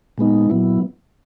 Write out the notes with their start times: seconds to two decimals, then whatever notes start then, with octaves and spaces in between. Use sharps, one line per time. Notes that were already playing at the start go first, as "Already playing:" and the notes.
0.18 A#2 G#3 B3 D#4
0.50 A#2 F#3 B3 E4